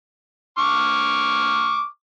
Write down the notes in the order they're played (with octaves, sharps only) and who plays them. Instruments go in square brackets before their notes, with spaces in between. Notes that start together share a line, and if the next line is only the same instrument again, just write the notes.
[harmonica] C#6 D6 F6